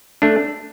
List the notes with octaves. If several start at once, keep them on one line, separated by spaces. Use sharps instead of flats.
A3 D4